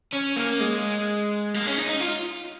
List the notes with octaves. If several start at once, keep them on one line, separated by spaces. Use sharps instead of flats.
C#4
A#3
G#3
A#3
C#4
D#4
D#4
F4